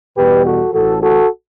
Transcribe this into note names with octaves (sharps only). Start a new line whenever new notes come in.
E2 B2 G3 G4 B4
F#4 A4
A1 A2 E3 F#4 A4
F#4 A4